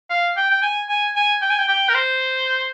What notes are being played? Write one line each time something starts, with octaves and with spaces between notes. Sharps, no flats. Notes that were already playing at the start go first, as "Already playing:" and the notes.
F5
G5
G5
G#5
G#5
G#5
G5
G#5
G5
G5
A#4
C5